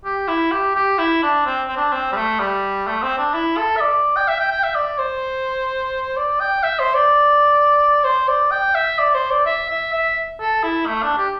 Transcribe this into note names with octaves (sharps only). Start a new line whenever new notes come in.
G4
E4
G4
G4
E4
D4
C4
C4
D4
C4
G3
A3
G3
A3
C4
D4
E4
A4
E5
D5
G5
E5
G5
G5
E5
D5
C5
D5
G5
E5
C5
D5
C5
D5
G5
E5
D5
C5
D5
E5
E5
E5
A4
E4
A3
D4
G4